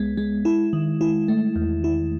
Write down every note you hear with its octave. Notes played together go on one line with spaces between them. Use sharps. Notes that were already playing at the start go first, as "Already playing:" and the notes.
Already playing: C#2 G#3 B3
G#3
E4
D#3
E4
A3
E2
E4